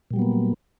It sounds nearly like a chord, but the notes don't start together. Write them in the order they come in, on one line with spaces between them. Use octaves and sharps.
A#2 G3 F#3 B3 A#3